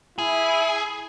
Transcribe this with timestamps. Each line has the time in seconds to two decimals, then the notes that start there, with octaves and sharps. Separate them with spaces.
0.18 E4 G#4